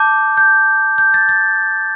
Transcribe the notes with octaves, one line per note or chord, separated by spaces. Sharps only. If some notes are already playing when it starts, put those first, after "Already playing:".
Already playing: A5 D6 G6
G6
G6
A6
A6